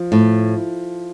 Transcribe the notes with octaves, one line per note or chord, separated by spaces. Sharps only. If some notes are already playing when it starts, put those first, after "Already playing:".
Already playing: F3
A2